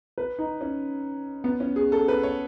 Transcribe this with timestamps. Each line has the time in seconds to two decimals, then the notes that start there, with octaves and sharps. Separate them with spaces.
0.18 B4
0.39 D#4
0.61 C#4
1.44 B3
1.60 C#4
1.76 G#4
1.92 A4
2.08 B4
2.23 C#5